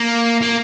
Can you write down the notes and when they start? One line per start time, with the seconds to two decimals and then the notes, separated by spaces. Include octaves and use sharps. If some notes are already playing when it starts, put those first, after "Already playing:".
Already playing: A#3
0.42 A#3